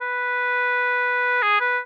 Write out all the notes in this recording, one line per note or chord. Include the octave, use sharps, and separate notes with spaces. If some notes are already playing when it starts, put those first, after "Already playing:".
B4
G#4
B4